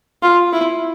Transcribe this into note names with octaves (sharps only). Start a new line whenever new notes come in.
F4
E4